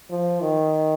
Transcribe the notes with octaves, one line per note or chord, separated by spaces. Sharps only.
F3
D#3